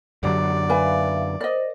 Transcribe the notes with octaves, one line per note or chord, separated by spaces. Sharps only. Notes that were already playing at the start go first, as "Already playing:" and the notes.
F#2 D3 F#3 G4 D5
B4 E5 F5 G#5
A#4 C5 D5 D#5